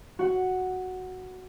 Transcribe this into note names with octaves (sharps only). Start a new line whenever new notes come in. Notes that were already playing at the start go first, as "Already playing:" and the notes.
F#4 F#5